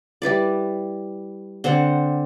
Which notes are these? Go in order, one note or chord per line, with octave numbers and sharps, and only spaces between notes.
G3 E4 B4 D5
D3 C4 C5 F#5